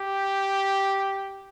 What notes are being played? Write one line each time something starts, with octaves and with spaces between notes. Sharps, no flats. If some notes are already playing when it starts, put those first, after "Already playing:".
Already playing: G4